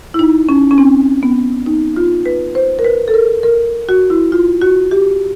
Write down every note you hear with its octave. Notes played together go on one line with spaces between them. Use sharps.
E4
D#4
C#4
C#4
C4
B3
D#4
F4
B4
C5
A#4
B4
A4
A#4
A#4
F#4
E4
F4
F#4
G4